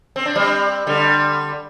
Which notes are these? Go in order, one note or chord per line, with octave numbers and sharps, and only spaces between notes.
C4
D4
G3 C4
D3 G3